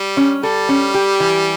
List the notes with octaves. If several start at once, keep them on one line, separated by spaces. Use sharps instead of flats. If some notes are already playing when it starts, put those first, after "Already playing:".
Already playing: G3
C#4
G3 A4
C#4
G4
E3